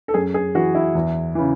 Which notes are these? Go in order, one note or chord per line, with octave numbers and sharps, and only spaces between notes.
A4
F#2 G#4
G#4
E3 F#4
E4
E2
C#3 E3